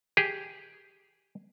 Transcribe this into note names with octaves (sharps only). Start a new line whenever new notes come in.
G4 G#4